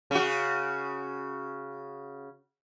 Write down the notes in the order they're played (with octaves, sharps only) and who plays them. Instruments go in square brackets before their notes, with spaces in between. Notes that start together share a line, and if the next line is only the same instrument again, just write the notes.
[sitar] C#3 F#4